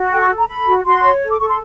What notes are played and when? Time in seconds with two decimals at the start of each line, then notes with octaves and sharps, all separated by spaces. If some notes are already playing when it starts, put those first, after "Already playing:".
Already playing: F#4
0.11 A4 G5
0.20 C#6
0.29 A4
0.39 A#5
0.48 A4 B5
0.66 F#4
0.84 F#4 C6
1.03 C#5
1.21 A4
1.31 D6
1.39 A4 C#6
1.49 C6